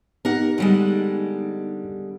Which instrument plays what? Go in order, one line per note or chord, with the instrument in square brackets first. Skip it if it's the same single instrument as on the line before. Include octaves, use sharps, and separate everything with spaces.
[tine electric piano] B3 D#4 G4 [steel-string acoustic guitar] A#4 F#5
[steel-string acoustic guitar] D3 G3 G#3